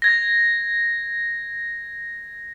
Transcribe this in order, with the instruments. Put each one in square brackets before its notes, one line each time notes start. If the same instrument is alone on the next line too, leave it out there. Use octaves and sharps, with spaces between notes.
[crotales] G#6 A#6